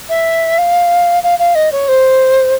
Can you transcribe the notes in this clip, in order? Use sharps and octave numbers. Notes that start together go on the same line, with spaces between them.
E5
F5
F5
F5
D#5
C#5
C5